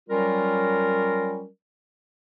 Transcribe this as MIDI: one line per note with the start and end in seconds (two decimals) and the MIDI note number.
0.09 1.46 54
0.09 1.46 55
0.09 1.46 61
0.09 1.46 65
0.09 1.46 70